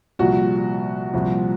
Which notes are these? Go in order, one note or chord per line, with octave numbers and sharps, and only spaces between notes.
C2 A#2 F3 F#4
C2 A#2 F3